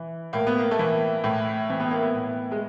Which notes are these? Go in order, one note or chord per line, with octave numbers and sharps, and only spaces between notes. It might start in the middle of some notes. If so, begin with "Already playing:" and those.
Already playing: E3
A2 A#3
B3
A#3
A3
E3 A#3
A2
E3 C4
B3
A#3
B3
A2
G#3